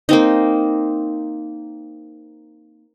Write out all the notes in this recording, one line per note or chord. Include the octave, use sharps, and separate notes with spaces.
A#3 C4 D#4